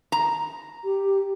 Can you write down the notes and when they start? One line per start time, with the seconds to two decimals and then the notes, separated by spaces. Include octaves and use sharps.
0.12 A#5
0.84 G4